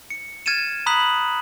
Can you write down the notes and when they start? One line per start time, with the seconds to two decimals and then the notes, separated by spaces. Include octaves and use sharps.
0.10 C#7
0.46 F6 G#6 A6 C#7 D#7 E7
0.86 A#5 B5 D#6 F#6 B6 F#7